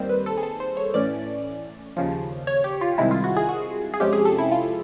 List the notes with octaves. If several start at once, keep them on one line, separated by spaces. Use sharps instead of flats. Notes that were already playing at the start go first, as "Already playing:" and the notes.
Already playing: D#2 D#3 G3 C4 C5
B4
A4
G#4
A4
C5
C#5
A2 E3 A3 C#4 D5
D#2 C#3 F3
C#5
G4
F4
C2 C3 D#3 G#3 E4
F4
F#4
G#4
F#4
G#4
F2 C3 F3 G#3 C#4 G4
G#4
A4
E4
F4